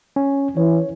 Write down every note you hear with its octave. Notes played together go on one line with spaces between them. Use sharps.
C#4
E3 C#5